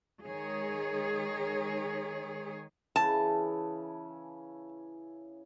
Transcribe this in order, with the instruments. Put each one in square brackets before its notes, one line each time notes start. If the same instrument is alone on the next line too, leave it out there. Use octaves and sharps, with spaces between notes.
[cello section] D#3 G#3 G#4 C#5
[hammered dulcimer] C#3 E3 [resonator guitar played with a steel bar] A5